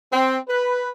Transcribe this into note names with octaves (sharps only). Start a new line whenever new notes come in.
C4
B4